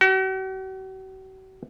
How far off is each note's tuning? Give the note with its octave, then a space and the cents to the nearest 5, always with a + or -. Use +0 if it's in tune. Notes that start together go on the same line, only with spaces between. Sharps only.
F#4 +45